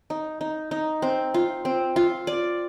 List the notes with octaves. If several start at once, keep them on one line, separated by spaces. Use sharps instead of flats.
D#4
D#4
D#4
C4
F4
C4
F4
D5